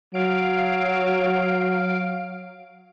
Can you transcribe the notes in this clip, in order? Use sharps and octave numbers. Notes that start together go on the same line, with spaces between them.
F#3 F5 D7